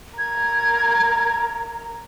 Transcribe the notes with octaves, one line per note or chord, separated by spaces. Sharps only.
A#4 G#6